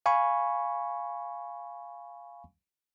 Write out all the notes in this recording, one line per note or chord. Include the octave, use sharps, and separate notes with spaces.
F5 G#5 B5 C#6